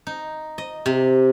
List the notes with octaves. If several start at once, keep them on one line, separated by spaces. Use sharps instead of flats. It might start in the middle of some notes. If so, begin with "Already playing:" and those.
D#4
D#5
C3